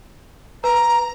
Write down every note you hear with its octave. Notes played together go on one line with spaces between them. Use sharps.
B4 A#5